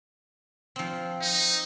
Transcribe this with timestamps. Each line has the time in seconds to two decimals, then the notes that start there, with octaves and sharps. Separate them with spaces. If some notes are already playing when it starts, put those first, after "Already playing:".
0.76 F3 C4
1.22 D#4